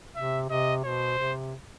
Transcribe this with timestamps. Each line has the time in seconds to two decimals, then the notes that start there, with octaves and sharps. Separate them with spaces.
0.16 C3 E5
0.50 C3 D#5
0.84 B2 C5
1.18 C3